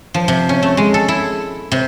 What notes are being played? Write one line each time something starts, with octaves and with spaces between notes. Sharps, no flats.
F3
C3
C#4
A3
G#3
A4
E4
C3